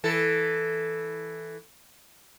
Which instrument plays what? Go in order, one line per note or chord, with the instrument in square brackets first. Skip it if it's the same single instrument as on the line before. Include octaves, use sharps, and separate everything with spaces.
[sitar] E3 A4